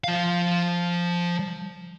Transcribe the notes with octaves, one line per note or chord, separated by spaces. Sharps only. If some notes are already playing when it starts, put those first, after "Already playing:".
F3 F5